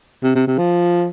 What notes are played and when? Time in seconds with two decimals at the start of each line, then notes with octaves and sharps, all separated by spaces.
0.23 C3
0.35 C3
0.48 C3
0.59 F3